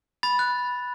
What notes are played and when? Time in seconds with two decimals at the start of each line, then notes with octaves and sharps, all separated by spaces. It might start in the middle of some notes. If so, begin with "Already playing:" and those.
0.23 B5 A6
0.39 F#6